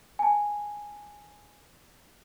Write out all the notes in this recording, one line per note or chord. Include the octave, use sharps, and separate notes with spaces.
G#5 A5